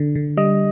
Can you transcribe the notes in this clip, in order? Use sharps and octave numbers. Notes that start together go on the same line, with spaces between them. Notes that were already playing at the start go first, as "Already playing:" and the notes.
Already playing: D3
D3
G3 D#5